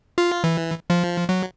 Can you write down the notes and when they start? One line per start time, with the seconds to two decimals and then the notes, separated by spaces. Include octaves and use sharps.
0.18 F4
0.44 E3
0.90 F3
1.29 F#3